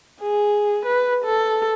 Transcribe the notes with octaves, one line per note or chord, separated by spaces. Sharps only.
G#4
B4
A4